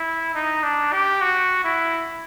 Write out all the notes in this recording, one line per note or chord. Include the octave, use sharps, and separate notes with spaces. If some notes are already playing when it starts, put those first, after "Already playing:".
Already playing: E4
D#4
D4
G4
F#4
E4